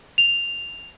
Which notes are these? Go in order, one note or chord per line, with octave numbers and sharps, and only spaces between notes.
F7